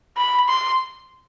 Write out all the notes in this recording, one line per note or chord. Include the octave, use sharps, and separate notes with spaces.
B5
C6